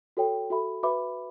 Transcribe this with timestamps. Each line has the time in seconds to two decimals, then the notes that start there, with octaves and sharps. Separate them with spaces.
0.17 F#4 A4 C#5 G5
0.50 F#4 A4 E5 B5
0.83 F#4 B4 E5 B5 D6